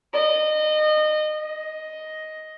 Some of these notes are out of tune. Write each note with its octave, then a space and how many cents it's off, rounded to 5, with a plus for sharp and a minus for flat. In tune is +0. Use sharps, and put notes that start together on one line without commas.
D#5 -25
D#5 +5